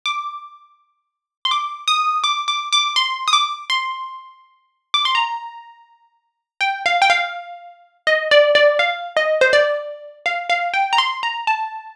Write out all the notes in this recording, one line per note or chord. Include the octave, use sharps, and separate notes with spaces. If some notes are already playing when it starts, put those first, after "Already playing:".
D6
C6
D6
D#6
D6
D6
D6
C6
D#6
D6
C6
D6
C6
A#5
G5
F5
G5
F5
D#5
D5
D5
F5
D#5
C5
D5
F5
F5
G5
A#5
C6
A#5
A5